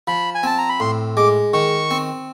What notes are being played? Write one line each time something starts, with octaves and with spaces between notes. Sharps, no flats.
F3 B5
G#5
C4 A5
A#5
B5
A2 C6
G#3 D6
D#3 C#6
C4